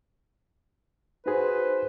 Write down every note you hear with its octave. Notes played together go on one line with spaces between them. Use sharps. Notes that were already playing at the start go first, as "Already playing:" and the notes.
D#4 F#4 G#4 B4 C5